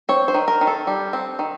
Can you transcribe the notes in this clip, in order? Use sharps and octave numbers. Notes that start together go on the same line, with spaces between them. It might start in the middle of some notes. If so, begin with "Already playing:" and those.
C4 C#5
C5
D#3
A#4
D#3
A4
G3
C4
D#3